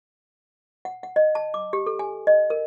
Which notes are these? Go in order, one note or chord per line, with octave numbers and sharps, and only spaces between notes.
F#5
F#5
D#5
A5
D6
G4
A4
G#5
D#5
A#4